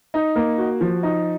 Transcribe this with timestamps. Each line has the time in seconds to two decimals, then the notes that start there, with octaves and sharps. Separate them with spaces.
0.14 D#4
0.36 A#3
0.58 F#4
0.81 F3
1.03 D#4